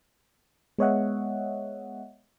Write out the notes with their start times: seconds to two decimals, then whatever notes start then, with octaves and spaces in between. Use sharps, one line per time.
0.78 G#3 B3 C#5 D#5 E5 F#5